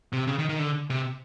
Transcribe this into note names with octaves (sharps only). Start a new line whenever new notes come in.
C3
C#3
D#3
D#3
D3
C3